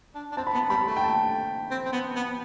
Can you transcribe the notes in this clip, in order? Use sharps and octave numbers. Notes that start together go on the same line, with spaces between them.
D4
D4
C4 A5
B5
B3 A5
G3 B5
A3
G5
A5
C4
C4
B3
B3